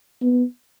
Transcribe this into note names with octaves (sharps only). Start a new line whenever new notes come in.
B3